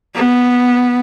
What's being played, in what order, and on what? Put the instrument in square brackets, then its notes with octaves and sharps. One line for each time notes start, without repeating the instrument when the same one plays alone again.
[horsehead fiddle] B3